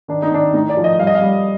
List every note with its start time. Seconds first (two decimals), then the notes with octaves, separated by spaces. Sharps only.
0.08 D#3 D4
0.22 D#4
0.31 D#3 D4
0.54 A2 D#4
0.69 D5
0.77 F3
0.84 D#5
0.99 G3 F5
1.07 D#5
1.15 F5
1.21 G3